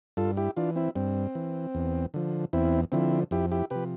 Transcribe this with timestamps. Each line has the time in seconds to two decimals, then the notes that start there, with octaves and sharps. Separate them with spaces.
0.17 G2 F4 A4
0.37 E4 G4
0.57 E3 D4 F4
0.76 C4 E4
0.96 G2 C4
1.35 E3
1.75 E2
2.14 D3 F3
2.53 E2 C4 E4
2.92 D3 F3 C4 E4
3.31 F2 E4 G4
3.51 E4 G4
3.70 C3 F3 G4 B4